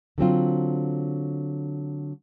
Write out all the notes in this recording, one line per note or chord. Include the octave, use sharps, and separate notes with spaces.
D3 F#3 C4 F4